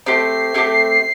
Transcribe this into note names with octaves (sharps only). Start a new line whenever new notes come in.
A3 C4 G4 C7
A3 C4 G4